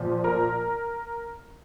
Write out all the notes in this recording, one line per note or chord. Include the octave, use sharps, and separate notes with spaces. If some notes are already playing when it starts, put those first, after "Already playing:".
Already playing: A#1 A#2 F3
A#4